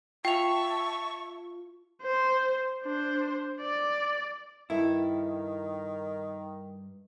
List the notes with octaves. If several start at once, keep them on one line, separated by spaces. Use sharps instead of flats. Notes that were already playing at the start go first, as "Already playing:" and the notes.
F4 E5 G5 A5 C#6 F7
C5
D4 C5
D5
G2 D#3 E4 A4